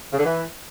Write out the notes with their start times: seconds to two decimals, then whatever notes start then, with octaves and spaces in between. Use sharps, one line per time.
0.13 C#3
0.19 D3
0.24 E3